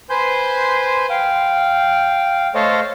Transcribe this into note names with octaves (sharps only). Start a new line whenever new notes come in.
B4 C5 G#5 C6 G6
F5 G5
A3 A4 C5 C#5 D#5 F5